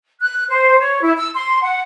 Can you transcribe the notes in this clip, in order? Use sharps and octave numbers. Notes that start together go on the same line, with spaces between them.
F#6
C5
C#5
E4
E6
C6
F#5